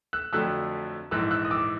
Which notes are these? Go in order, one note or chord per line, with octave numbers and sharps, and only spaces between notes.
E6 F#6
F2 D3 F#3 A3 E6 F#6
A#1 G#2 E3 E6 F#6
E6 F#6
D#6
D6 E6